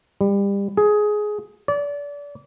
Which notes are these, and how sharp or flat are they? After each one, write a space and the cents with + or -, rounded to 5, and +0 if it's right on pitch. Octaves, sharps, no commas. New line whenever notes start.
G3 +30
G#4 +15
D5 -30